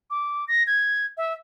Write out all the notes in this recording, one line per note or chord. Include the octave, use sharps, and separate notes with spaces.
D6
A#6
G#6
E5